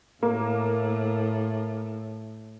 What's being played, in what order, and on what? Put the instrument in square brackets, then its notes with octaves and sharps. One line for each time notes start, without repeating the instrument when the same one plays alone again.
[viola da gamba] A2 [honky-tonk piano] A#3